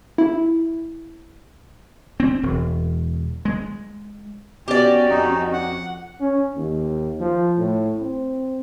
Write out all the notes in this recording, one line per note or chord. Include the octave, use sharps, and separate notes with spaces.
E4
C4
E1
G#3
B3 C#4 F#4 G4 D5
F2 D#4
F#5
C#4
D#2
F3
A2
C4